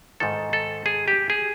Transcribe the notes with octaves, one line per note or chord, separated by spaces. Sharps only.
G#2 D#3 A4
A4
G#4
G4
G#4